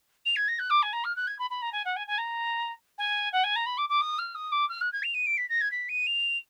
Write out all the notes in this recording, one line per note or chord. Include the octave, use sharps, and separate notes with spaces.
F7
G#6
A#6
F#6
D6
G#5
A#5
F6
F#6
G#6
B5
B5
A#5
G#5
F#5
G#5
G#5
A#5
G#5
F#5
G#5
A#5
B5
D6
D6
D#6
F6
D#6
D6
F6
F#6
G#6
F7
D#7
D7
B6
A#6
G#6
B6
D#7
F7